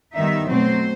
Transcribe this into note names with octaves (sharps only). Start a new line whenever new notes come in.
D#3 G3 B3 D#4 E5
B2 F#3 A3 C4 C5